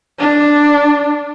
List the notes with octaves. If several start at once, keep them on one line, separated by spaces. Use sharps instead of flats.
D4